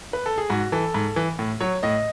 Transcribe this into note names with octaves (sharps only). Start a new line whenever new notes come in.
B4
A4
G#4
G#2 F#4
E3 A4
G#2
E3
A2
F#3 C#5
A2 D#5